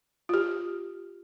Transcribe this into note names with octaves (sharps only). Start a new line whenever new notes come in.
F4 G4